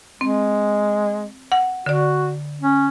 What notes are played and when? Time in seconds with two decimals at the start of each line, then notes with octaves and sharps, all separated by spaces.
0.21 G#3 C4
1.52 F#5
1.86 D3 F#4 D5
2.62 C#4